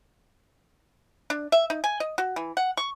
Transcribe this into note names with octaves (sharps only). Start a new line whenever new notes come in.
D4
E5
D#4
G#5
D#5
F#4
E3
F#5
C#6